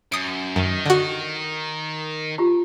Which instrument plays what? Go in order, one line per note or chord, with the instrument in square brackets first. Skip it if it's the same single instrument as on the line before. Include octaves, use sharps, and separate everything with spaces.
[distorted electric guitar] F#2 [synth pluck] D#6 D7
[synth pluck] F#2 [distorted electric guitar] D#3
[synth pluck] D3 F#4
[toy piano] F4 G4 A#5